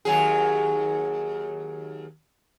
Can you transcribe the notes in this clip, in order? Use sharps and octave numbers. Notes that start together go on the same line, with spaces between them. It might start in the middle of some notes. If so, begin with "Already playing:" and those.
D#2 F#3 G#4